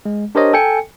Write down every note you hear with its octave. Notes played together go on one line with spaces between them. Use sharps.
G#3
D4 G4 A#4 C5 C#5 D#5
A4 G5 G#5 C#7